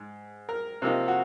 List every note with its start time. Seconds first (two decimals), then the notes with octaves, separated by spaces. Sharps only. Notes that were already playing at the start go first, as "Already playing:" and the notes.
Already playing: G#2
0.49 A#4
0.82 C3 F3 A#3 D#4
1.08 F#4